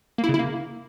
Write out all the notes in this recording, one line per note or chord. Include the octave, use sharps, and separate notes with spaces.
A#3
E4
C#3
E4
A#3